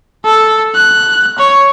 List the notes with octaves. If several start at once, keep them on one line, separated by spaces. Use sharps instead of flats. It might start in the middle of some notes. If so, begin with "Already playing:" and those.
A4
F#6
C#5